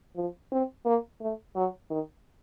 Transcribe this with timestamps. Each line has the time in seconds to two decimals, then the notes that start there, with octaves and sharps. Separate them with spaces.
0.16 F3
0.52 C4
0.85 A#3
1.21 A3
1.56 F#3
1.90 D#3